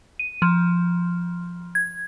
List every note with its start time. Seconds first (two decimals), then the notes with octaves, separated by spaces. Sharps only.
0.19 D#7
0.42 F3
1.75 G#6